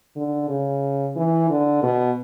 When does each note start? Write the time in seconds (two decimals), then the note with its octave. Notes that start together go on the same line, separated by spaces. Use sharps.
0.16 D3
0.49 C#3
1.16 E3
1.50 D3
1.83 B2